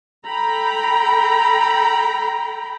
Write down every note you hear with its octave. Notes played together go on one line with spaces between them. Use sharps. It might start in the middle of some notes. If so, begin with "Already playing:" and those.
A4 G5 A#5 B5